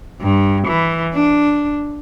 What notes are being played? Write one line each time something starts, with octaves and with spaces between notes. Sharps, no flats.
G2
E3
D4